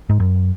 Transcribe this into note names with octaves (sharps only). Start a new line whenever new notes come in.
G#2
F#2